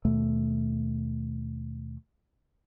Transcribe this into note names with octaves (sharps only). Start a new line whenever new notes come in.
D#2 B2 A3